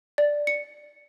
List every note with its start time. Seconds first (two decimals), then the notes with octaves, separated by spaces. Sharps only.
0.18 D5
0.47 C#7